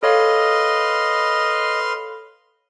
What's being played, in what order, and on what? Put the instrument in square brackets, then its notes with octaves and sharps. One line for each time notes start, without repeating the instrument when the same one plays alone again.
[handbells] A4 C#5 F5 [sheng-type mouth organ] B4 C6 F6 [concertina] D#5